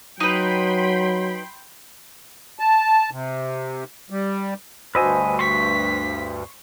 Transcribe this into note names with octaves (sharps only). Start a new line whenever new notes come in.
F#3 D#4 B4 G5 B5 C6
A5
C3
G3
D2 G2 F#4 B4 C5 D#5 G#5 E6
C6 C#6 B6